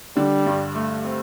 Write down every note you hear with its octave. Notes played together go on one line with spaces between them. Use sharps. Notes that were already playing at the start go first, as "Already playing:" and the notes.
D3 G3
G2
A3
C4